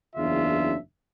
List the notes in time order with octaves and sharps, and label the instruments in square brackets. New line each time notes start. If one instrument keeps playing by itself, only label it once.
[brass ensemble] F#1 E2 C#3 D4 F4 E5